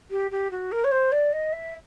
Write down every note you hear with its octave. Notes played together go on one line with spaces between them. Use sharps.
G4
G4
F#4
A#4
C#5
C5
D5
D#5
E5